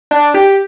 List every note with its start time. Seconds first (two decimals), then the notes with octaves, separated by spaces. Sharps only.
0.11 D4
0.34 G4